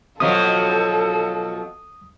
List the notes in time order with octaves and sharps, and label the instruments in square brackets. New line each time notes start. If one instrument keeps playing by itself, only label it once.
[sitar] B2 F3 F#3 [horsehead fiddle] A4 [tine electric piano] D#6